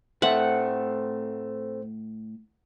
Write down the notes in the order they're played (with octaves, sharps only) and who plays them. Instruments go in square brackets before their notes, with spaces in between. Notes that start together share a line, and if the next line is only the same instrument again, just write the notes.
[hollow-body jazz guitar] A2 A4 E5 [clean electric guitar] A3 C4 [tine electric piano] C5 [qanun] F#5